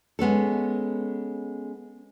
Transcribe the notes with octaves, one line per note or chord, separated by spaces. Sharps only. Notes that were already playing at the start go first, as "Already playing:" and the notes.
G#3 B3 C#4 A4